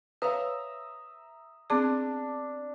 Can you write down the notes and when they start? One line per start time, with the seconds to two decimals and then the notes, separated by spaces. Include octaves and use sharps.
0.22 B4 C#5 E5 F5 A#5 D#6
1.70 B3 C4 D4 G#4